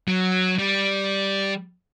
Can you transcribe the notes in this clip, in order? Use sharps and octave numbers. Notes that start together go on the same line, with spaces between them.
F#3
G3